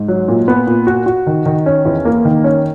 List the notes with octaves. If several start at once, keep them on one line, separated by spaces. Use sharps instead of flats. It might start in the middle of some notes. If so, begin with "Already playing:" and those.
Already playing: G#2
F#3
A#2
B3
A#2
F#4
F#4
D#3
D#3
C#4
E2
A#3
D#3
C#4